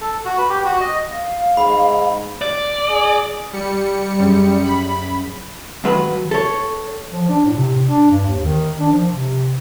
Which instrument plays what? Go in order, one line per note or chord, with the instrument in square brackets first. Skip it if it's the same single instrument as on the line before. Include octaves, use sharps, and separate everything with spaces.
[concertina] A4
F#4
B4
G4
F#4
D#5
[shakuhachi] F5
[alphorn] G#2 [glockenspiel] B5
[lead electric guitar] D5
[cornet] G#4
[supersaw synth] G3 C#7
[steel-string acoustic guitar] F#2 C#4 G#4
[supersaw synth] B5
[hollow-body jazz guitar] D#2 F#3 B4
A4 C#5
[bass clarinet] F3
D4
A2
C3
D4
G2
D#2
D#3
D4
F3
C3